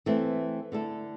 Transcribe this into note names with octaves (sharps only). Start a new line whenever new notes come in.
E3 A3 C4
D3 A3 E4 A4